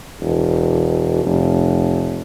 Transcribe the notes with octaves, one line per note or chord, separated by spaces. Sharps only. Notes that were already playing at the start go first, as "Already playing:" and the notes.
E1
F1